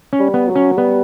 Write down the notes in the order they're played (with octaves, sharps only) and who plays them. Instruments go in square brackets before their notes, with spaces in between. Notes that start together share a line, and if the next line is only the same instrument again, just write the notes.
[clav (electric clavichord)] C#4
[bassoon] G3
[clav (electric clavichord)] B3
[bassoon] F#3
[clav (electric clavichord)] C#4
[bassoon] G3 [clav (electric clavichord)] B3